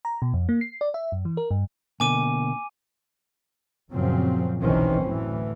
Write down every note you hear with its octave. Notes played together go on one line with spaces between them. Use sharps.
A#5
B2
F2
A#3
C7
D5
E5
F#2
E3
A#4
G2
B2 D3 A#3 G#5 D6 D#7
F#2 A#2 C#3 F3 F#3 C4
F#1 B1 D#3 E3 C4 C#4
D2 A2 E3